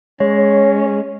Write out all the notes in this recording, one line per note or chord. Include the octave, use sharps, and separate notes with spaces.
G#3 C#4 C#5